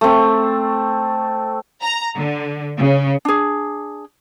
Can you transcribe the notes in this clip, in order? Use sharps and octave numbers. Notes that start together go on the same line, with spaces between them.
A3 C4
A#5
D3
C#3
D4 G#4